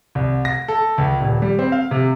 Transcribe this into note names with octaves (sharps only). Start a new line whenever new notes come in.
C2
A#6
A4
C#2
D#1
G3
C4
F5
C3